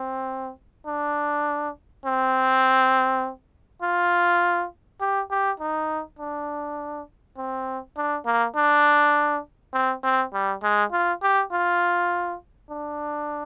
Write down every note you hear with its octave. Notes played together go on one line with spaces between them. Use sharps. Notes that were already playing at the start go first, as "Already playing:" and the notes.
Already playing: C4
D4
C4
F4
G4
G4
D#4
D4
C4
D4
A#3
D4
C4
C4
G3
G#3
F4
G4
F4
D4